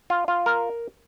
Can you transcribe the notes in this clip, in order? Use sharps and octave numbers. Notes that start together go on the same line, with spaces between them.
F4
F4
A#4